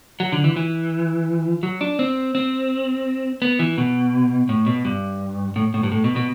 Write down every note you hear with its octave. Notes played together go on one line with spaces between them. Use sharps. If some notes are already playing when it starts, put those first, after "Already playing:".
F#3
D3
E3
E3
F#3
D4
C4
C4
B3
E3
B2
A2
B2
G2
A2
A2
G2
A2
B2
B2